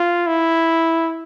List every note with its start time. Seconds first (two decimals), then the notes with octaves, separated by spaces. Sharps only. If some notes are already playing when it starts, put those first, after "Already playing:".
Already playing: F4
0.27 E4